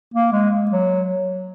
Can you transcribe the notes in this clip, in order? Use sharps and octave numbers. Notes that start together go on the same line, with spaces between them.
A#3
G#3
F#3